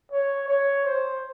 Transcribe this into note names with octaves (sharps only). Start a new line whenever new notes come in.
C#5
C#5
C5